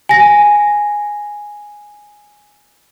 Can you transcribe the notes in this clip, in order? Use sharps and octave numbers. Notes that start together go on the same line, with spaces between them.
G#5 A#6